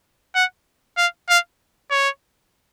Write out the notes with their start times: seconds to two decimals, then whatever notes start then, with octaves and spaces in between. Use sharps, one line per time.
0.35 F#5
0.97 F5
1.29 F5
1.91 C#5